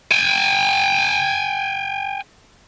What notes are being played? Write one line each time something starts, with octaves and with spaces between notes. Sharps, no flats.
G5 G#5